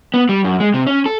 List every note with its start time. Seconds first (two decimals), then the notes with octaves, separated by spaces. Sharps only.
0.14 B3
0.29 G3
0.44 F#2
0.60 G#3
0.74 C3
0.87 C#4
1.06 A4